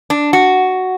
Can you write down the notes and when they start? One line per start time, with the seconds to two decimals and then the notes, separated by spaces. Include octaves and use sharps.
0.10 D4
0.33 F#4